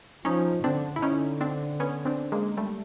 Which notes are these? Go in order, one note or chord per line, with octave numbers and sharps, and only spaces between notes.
F3 C#4 D#4
D3 C4 D4
E4
D3 C#4 D#4
C4 D4
B3 C#4
C4 D4
G#3 A#3
G3 A3